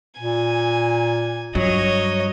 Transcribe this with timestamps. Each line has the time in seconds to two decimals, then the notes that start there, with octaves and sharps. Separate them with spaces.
0.19 A#2 G#5
1.55 G2 F#3 C#5 D#5